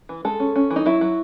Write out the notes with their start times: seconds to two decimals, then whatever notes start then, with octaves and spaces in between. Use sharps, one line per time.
0.09 E3
0.25 G#3 A4
0.40 C#4
0.56 C#4
0.71 E3
0.76 D#4
0.86 F#3 E4
1.01 F#3